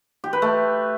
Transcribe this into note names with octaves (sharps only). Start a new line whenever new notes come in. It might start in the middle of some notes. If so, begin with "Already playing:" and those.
G4
B4
A3